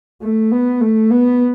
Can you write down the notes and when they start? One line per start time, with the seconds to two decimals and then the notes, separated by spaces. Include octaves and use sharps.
0.22 A3
0.51 B3
0.81 A3
1.11 B3